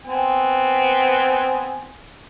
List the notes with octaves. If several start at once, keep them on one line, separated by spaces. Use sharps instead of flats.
B3 C4 G#5